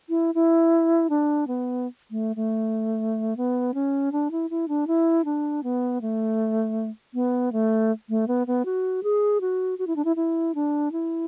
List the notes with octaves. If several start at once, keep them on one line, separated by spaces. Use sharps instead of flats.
E4
E4
D4
B3
A3
A3
B3
C#4
D4
E4
E4
D4
E4
D4
B3
A3
B3
A3
A3
B3
B3
F#4
G#4
F#4
F#4
E4
D4
E4
E4
D4
E4